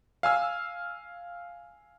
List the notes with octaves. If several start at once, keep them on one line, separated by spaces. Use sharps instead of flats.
F5 G#5 E6 F6